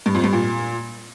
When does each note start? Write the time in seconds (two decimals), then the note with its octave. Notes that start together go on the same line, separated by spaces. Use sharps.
0.06 G2
0.15 F2
0.24 G2
0.33 A#2